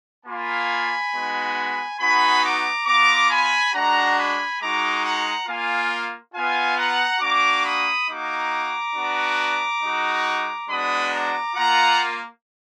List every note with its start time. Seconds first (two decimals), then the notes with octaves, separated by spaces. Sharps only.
0.25 A#3 F4 G#5 B5
1.12 G#3 B3 D#4 F#4
2.00 B3 D#4 F#4 G#5 B5
2.42 A#5 D6
2.86 B3 F4 A#5 D6
3.30 G#5 B5
3.73 G#3 D4 F#4 F#5 A#5
4.16 G#5 B5
4.60 G#3 D#4 F#4 A#5 D6
5.04 F#5 A#5
5.47 A#3 F4 F5 G#5
6.34 B3 F4 F5 G#5
6.77 F#5 A#5
7.20 A#3 D4 F#4 A#5 D6
7.64 B5 D#6
8.08 A#3 D#4 F#4 A#5 D6
8.95 B3 D4 F#4
9.82 G#3 D#4 F#4
10.68 G#3 B3 D4 F#4 B5 D#6
11.12 A#5 D6
11.55 A#3 F4 F#5 A#5